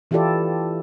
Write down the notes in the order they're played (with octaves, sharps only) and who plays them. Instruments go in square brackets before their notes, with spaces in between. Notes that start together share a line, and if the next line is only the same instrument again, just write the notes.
[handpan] E3 E4 F4 G4 A4 D5